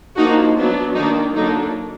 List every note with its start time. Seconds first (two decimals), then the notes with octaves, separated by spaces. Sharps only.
0.17 F3 A#3 D4 D#4 F#4
0.56 F#3 B3 D4
0.95 D#3 A#3 D4 D#4
1.34 D3 F#3 A#3 D4 D#4